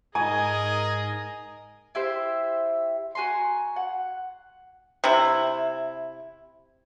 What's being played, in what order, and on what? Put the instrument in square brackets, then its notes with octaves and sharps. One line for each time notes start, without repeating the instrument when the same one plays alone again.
[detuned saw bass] G#2 [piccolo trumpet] G#4 [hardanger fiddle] A#4 D#5 [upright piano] G#5
[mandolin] E4 G4 C5 E5
F#4 G#5 A#5 C6
F#5
[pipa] C3 E4